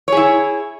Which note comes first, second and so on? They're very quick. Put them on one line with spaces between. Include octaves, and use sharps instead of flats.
C#5 G#4 E4